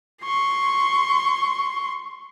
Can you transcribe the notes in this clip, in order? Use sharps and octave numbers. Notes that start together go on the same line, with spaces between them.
C6 C#6